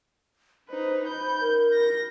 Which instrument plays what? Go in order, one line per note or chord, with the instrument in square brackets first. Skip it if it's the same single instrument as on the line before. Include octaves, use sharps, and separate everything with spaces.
[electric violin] D#4 B4 [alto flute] C5
[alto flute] B5 [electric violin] G6
[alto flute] A#4
[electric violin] A#6